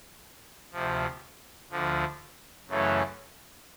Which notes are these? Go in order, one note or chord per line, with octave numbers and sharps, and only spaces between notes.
D2 C3 F3
D2 D3 F3
F#2 C#3 E3 A3 C#4